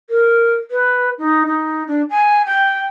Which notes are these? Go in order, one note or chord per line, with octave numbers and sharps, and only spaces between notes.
A#4
B4
D#4
D#4
D4
G#5
G5